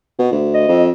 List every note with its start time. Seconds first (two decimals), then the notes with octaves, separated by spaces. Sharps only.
0.19 B2
0.31 D2
0.54 D#5
0.68 F2